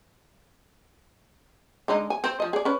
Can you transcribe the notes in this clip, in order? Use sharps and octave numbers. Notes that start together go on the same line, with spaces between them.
D3 G#3 D#4
G#5
C4 C5
F3 D#5
G#4 D5
C#4 B4